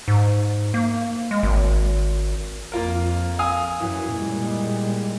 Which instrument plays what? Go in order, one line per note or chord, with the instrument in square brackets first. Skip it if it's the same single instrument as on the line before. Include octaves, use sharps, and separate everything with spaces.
[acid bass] G#2
A#3
G#3
G#1
[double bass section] F2 [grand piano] A#3 F4 A#4
[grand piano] F5 G#5 D#6
[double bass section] F#2 [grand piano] E3
[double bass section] A#2 G3 G#3